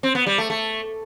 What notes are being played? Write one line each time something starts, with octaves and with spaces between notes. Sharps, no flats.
C4
B3
G3
A3
A3